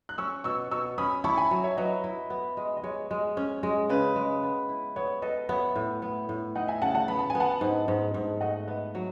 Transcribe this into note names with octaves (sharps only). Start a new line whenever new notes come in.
F#6
C#4 C#6 E6
B2 C#6 E6
B2 C#6 E6
C#4 B5 D#6
E4 A5 C#6
G#5 B5
F#3
C#5 E5
F#3 B4 D#5
E4
B3
G#3
D#5
G#3 C#5
G#3
C#4
G#3
C#3 B4
G#3
B3
E4
B3 C#5
A4 B4 D#5
B3 C#5 E5
A2
B3
A2
D#4 D#5 F#5
E5 G#5
C#3 F#5 A5
F#5 A5
B3 B5
A5
G#5
B3
F#5 A5
G#2
G#2
G#2
A3 D#5 F#5
B3 B4 D#5
F#3